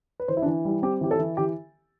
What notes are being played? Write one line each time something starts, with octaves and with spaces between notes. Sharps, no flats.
B4
E3 C5
E4
D4
E3
G3 E4
C4 G4
E3 G4
A4
E3
E3 G4